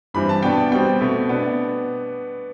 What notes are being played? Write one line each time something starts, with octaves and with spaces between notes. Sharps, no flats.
G2 E3 G3 C4 B5
A5
B2 B3 D4 G5
B2 G3 C4 G5
B2 A3 C4
B2 B3 D4